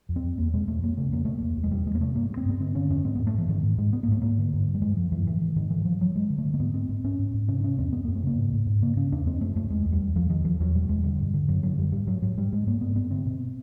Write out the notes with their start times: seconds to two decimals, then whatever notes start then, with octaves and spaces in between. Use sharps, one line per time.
0.09 F2
0.16 C4
0.24 F2
0.38 E2 A#3
0.54 B2 G#3
0.67 E2 A3
0.83 F2 A#3
0.97 C#3 A3
1.12 F2 A#3
1.25 B2 A3
1.38 E2 A#3
1.57 E2
1.64 G#3
1.71 E2 G3
1.86 E2 G#3
1.95 A#3
2.00 C3 A3
2.15 G2 A#3
2.30 G2
2.37 C4
2.46 G2 B3
2.60 D3 C4
2.75 D3 C#4
2.90 F2 C#4
3.04 G#2 C4
3.15 B3
3.19 G#2
3.27 A3
3.34 G#2 E3
3.48 G#2 D#3
3.63 G#2
3.78 G#2 G#3
3.93 G#2 B3
4.03 A#3
4.08 G#2 A3
4.22 G#2 A#3
4.38 D3
4.53 G2
4.68 G2
4.74 G3
4.82 F#2 G#3
4.97 F#2 F3
5.12 F#2 E3
5.27 G#2 E3
5.41 G#2 E3
5.56 G#2 D#3
5.71 G2 E3
5.85 G2 F3
6.01 G2 F#3
6.16 G2 G#3
6.30 D3
6.38 A3
6.45 D3
6.54 A#3
6.60 G#2 B3
6.74 G#2 C4
6.89 G#2 C4
7.04 G#2 C#4
7.19 G#2
7.34 G#2
7.48 C3 C#4
7.60 D4
7.63 C3 C#4
7.78 E2 C4
7.93 F#2 B3
8.05 A#3
8.08 F#2
8.15 A3
8.23 C#3 A#3
8.38 G#2
8.53 G#2
8.67 G#2
8.81 C#3 A#3
8.97 C#3 C#4
9.12 E2 D4
9.26 F#2 C4
9.41 F#2 A3
9.56 F#2 A3
9.70 E2 G#3
9.86 E2
9.92 G3
10.01 E2
10.15 E2 F3
10.30 E2 D#3
10.45 E2 F3
10.60 E2 F#3
10.74 B2 G3
10.89 E2 G#3
11.04 D3 G3
11.19 G2
11.34 D3
11.48 F#2 F#3
11.63 D3 F#3
11.78 F#2 G3
11.92 G#2 G3
12.07 G#2 F#3
12.22 G#2 F#3
12.37 G#2 G3
12.52 G#2 G#3
12.67 G#2 A#3
12.81 G2 B3
12.96 G2 B3
13.11 D3 C4
13.26 B2